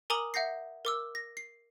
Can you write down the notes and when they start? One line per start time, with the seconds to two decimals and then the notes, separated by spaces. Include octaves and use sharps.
0.10 A#4 G#5 A#5 D6 D#6 F#7
0.34 E5 F#5 G6 A#6 C7
0.85 A#4 D6 E6
1.15 A#6
1.37 C7